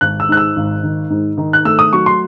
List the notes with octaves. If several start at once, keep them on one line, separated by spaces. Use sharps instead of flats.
G#1 F#6
E6
G#2 F#6
E6
G#1
D#3
G#2
D#3
F#6
A3 E6
D#6
F#3 C#6
C6